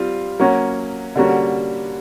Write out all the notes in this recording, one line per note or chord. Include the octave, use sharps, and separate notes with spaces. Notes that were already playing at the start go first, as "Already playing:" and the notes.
Already playing: G3 C4 F4
F#3 A#3 C#4 F#4
D3 G3 A#3 C#4 F#4